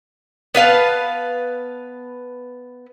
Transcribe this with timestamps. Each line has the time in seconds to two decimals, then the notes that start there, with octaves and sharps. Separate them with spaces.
0.55 B3 B4 F5 A5